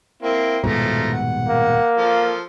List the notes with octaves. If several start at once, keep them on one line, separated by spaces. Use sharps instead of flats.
A#3 C4 E4
D#1 G#2 B2 F3 A3 A#5
F#5
A#3
F3 A4